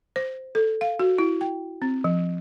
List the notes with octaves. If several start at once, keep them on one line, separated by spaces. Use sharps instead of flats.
C5
A4
F5
F#4
E4
G5
C4
F3